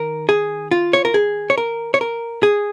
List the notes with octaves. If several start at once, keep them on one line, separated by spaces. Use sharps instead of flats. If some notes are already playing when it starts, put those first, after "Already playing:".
Already playing: D#3 A#4
G#4
F4
C#5
A#4
G#4
C#5
A#4
C#5
A#4
G#4